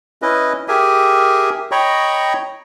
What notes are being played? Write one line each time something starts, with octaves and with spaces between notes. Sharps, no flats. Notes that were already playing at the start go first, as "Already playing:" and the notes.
C#4 E4 B4 D#5
G4 G#4 A#4 E5 G#5
C#5 D#5 G5 A#5 B5 C#6